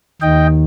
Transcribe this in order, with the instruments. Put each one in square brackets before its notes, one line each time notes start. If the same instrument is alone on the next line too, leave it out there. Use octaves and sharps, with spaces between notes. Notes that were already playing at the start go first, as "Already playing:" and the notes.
[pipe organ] D#2 D#3 D#5 G5